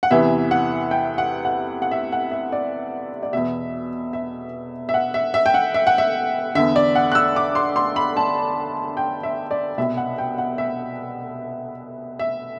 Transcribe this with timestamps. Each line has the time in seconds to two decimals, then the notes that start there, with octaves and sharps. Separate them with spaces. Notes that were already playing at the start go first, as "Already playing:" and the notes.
0.03 F#5
0.11 E2 C3 E3 E5
0.51 F#5
0.91 G5
1.18 F#5
1.45 F#5
1.82 F#5
1.91 E5
2.12 F#5
2.32 E5
2.52 D5
3.23 D5
3.33 E2 B2 E5
4.13 E5
4.89 E5
4.94 F#5
5.14 E5
5.34 E5
5.46 G5
5.54 F#5
5.74 E5
5.87 F#5
5.98 E5
6.55 E2 D3 E5
6.76 D5
6.95 F#5
7.12 F#6
7.15 E6
7.36 D6
7.55 C6
7.76 C6
7.96 B5
8.17 A5
8.97 G5
9.23 E5
9.51 D5
9.78 C2 B2 E5
9.97 F#5
10.18 G5
10.38 F#5
10.58 E5
12.19 E5